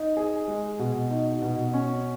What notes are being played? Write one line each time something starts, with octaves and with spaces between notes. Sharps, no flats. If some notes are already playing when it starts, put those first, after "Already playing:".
Already playing: D#4
G#4
G#3
B2
D#4
B2
C#4